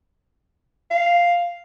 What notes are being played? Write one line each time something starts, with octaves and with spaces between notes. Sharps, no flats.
F5